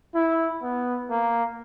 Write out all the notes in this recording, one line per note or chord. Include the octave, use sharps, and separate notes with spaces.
E4
B3
A#3